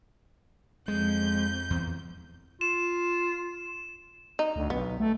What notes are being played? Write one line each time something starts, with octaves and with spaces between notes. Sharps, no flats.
F2 G#3 G6
E2
F4 E7
D#4
D2
B1 B3
A3